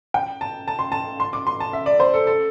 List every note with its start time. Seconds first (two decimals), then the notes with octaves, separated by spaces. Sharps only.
0.14 G5
0.41 A5
0.68 A5
0.79 C6
0.92 A5
1.20 C6
1.33 D6
1.47 C6
1.60 A5
1.73 E5
1.86 D5
2.00 C5
2.14 A4
2.27 A4